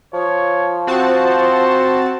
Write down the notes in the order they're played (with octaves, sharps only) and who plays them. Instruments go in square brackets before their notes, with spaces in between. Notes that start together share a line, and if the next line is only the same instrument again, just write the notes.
[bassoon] F3 [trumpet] C#5
[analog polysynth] C4 F#4 A5 [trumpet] C5